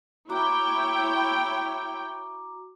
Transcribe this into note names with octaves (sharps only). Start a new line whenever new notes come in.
E4 F#4 C#5 G5 A#5 D6